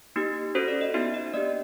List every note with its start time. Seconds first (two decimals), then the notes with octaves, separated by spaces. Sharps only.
0.16 A#3 D#4 G4
0.55 C#4 F#4 A4 C5
0.68 D5
0.81 D#5
0.94 B3 D#4 F#4 E5
1.14 D#5
1.34 A#3 D4 G4 D5